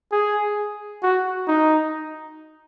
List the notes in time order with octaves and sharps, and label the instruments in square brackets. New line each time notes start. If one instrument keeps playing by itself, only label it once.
[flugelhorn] G#4
F#4
D#4